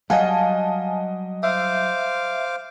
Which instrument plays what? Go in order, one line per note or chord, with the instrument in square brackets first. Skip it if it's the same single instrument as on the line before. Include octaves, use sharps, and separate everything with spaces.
[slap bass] F#3 G3 [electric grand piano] D#5 F#5 [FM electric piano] F5 G#5 A5
[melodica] C5 F5 D6 [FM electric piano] E5